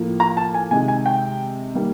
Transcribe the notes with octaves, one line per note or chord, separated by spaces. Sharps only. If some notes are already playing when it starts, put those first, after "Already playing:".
Already playing: A2 F3 A#3
A#5
A5
G#5
C3 D#3 G#3 G#5
G#5
G5
D#3 G3 A#3